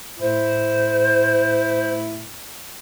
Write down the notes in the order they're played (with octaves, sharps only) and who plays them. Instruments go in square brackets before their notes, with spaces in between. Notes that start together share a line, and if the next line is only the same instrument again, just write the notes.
[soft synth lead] A2 [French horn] E4 [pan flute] C5